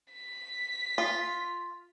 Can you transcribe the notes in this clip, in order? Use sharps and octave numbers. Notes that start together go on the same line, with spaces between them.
B6
F4